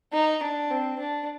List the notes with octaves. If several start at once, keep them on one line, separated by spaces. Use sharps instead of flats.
D#4
D4
C4
D4